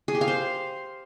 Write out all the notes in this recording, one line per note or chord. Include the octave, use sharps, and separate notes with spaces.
G#4
G4
F5
C5